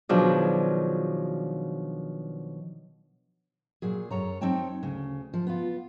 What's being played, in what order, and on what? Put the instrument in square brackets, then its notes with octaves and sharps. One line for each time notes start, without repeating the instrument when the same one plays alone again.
[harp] B2 D#3 F3 F#3 D4 G#4
[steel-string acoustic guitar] A#2 F#3 G#4
F#2 A4 C#5 A#5
F#3 C4 D#4 C#5 G5 A5
D2 C#3
F3
B3 F4